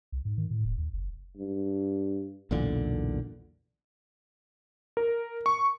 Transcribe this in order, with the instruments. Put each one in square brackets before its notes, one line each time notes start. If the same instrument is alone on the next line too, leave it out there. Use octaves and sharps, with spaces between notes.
[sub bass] C2
G#2
D#3
A2
D#1
D#2
F#1
[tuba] G2
[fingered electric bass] B1 E2 A#2 D3
[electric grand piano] A#4
C#6